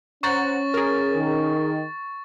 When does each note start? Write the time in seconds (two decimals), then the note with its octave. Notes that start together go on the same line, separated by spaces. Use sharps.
0.23 C#4 C5 F#5 A#5 C#6 A6
0.74 G#4 A#4
1.14 D#3